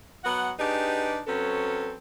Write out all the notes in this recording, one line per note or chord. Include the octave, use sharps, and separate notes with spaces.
F#3 B3 F#5
D4 D#4 G4 G#4 B4
F#3 C4 C#4 A4 B4